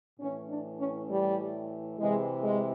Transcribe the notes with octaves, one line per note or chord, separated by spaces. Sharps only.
A2 E3 C#4
D4
C#4
G3
C3 E3 G#3
G#3